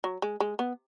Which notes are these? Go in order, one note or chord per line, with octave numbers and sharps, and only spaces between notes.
F#3
G#3
G#3
B3